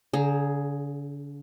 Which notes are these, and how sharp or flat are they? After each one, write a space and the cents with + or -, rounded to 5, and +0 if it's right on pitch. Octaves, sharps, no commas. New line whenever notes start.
D3 -45 G#4 +5 A#5 +0